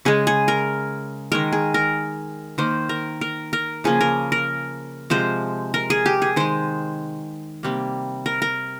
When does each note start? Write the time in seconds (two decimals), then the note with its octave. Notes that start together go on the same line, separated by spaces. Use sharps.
0.05 C#3 G#3 G#4
0.27 G#4
0.48 A#4
1.32 D#3 G#3 A#4
1.52 G#4
1.74 A#4
2.58 D#3 A#3 C5
2.89 A#4
3.21 A#4
3.53 A#4
3.84 C#3 F3 A#3 G#4
4.01 A#4
4.32 A#4
5.10 C3 F3 G#3 C5
5.74 A#4
5.90 G#4
6.06 G4
6.22 G#4
6.36 D#3 G#3 C5
7.63 C3 G3 A#3
8.26 A#4
8.42 A#4